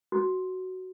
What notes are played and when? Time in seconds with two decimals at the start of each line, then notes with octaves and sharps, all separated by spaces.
0.12 F#4